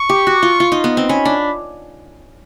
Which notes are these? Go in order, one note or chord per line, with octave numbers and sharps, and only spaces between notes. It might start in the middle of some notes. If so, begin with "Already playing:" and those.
Already playing: C#6
G4
F#4
F4
F4
D#4
B3
C4
C#4 B5
D4